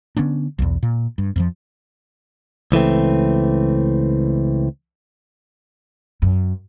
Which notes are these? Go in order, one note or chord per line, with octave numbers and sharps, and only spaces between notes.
D3 B3 C#4 D4
B1 E2
A#2
G2
F2 E3 F3
C#2 E3 A3 C4
F#2